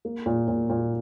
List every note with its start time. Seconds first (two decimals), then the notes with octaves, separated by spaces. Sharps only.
0.05 A#3
0.26 A#2
0.48 A#2
0.70 A#2